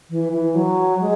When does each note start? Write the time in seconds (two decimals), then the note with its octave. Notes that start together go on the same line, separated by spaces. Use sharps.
0.10 E3
0.32 E3
0.54 F#3
1.00 G#3